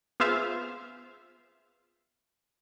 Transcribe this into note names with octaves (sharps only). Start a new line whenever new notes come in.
B3 F4 G#4 C5 E5 F5